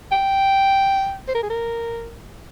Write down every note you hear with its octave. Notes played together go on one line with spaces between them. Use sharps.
G5
C5
A#4
G#4
A#4